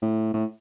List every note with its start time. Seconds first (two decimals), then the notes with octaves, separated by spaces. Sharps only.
0.02 A2
0.34 A2